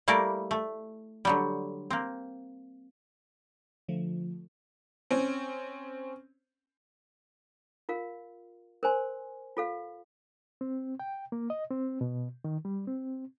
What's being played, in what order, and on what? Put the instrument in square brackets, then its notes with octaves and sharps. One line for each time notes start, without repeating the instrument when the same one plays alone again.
[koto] G3 A3 A#3 E4 A#4 D5
A3
D3 F#3 G3
A#3 C4
[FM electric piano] D3 F3 A3
[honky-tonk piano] C4 C#4
[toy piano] F4 A#4 F5
A#4 C5 G#5 C6
F4 A4 F5
[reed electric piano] C4
G5
A#3
D#5
C4
B2
D#3
G3
C4